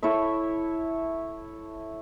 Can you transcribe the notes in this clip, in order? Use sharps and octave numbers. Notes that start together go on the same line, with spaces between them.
E4 A4 C#5 E5